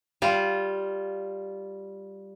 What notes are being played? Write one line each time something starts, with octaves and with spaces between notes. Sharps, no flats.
G3 F4